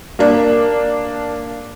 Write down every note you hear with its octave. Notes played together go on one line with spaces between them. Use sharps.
A#3 D4